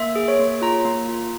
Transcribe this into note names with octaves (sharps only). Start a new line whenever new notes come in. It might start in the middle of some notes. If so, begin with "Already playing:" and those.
Already playing: A#3 E5
G#4
C#5
A#3
F4 A#5
A#3
F4